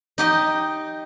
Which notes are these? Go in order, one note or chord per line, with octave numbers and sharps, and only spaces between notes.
D#4 G4 D#5